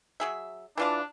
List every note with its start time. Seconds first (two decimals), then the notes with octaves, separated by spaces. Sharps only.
0.20 F#3 G#4 E5
0.78 E3 D4 F4 F5